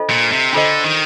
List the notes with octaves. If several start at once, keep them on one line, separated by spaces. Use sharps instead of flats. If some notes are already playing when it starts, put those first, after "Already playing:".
Already playing: D4 F4 A4 C5 D#5
A#2
C3
D3 D4 F4 A4 C5 D#5
D#3